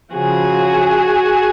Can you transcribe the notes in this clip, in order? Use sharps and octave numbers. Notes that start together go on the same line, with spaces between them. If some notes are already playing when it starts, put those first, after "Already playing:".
C#3 F3 F#4 G#4